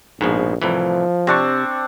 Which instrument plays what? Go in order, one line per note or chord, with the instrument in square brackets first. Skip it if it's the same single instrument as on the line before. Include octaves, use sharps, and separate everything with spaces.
[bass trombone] A#1 [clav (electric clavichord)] G#2 B2 F3
[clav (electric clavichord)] C2 A2 E3 [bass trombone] F3
[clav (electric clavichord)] C3 [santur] C4 D4 C#6